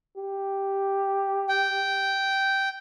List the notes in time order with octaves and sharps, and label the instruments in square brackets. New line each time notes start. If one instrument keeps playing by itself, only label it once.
[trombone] G4
[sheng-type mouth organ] G5